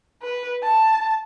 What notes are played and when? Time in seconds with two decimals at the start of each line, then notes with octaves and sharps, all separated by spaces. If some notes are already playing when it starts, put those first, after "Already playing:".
0.22 B4
0.63 A5